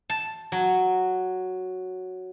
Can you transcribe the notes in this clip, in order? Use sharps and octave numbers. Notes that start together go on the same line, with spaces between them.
A5
F#3